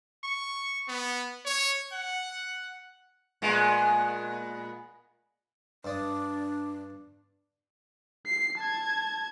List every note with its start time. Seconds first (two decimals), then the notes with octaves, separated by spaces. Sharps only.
0.24 C#6
0.88 B3
1.46 C#5
1.92 F#5
3.42 A#2 G#3 B3
5.85 G2 D4 D5 D#6
8.26 C7
8.58 A5 G#6